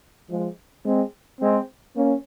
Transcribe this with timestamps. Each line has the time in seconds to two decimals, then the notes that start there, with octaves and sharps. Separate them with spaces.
0.29 F3 G#3
0.85 G#3 C4
1.40 G#3 C4
1.95 A#3 C#4